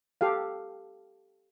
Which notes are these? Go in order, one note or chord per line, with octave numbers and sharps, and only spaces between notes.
G4 A4 F5